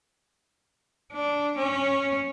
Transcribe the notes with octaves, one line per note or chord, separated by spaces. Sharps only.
D4
C#4